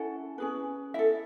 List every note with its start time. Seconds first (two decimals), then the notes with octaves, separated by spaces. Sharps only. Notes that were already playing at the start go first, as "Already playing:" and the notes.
Already playing: C#4 E4 A4 F#5
0.38 C#4 G#4 B4
0.94 E4 A4 E5